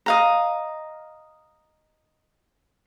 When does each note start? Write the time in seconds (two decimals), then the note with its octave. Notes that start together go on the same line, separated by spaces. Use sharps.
0.06 D#5 F5 A#5